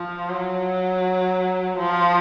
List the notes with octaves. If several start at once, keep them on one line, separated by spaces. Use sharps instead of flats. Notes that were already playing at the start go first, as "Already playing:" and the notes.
Already playing: F3
F#3
F3